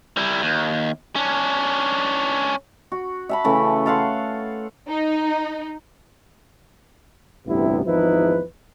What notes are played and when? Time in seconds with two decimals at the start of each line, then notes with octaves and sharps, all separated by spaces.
0.17 G3 E4
0.42 D#2
1.16 C#4 D4
2.92 F#4
3.29 E5 A5 B5
3.44 C#3 E3 A3
3.86 A4 F5 F#5 C6
4.88 D#4
7.46 A1 D2 G2 C3 B3 E4
7.86 G#1 E2 F3 D#4 E4 B4